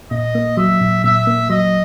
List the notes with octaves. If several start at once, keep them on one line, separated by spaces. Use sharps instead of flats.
A#2 D#5
A#3
F#3 E5
A#2
A#2 E5
A#3
F#3 D#5